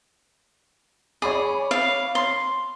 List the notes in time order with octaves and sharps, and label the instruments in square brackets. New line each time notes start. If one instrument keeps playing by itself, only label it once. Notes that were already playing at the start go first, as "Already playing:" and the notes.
[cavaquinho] G#4 [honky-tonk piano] C#5 B5 D6
[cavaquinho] F5
C6